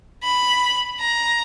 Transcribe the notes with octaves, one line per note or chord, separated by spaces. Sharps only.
B5
A#5